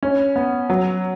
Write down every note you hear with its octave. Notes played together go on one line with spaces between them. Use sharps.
C#4
B3
F#3